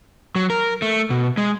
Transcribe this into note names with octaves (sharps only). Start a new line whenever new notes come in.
F#3
A#4
A3
B2
G#3